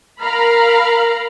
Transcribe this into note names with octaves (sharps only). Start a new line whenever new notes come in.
A#4 F5 A#5 B5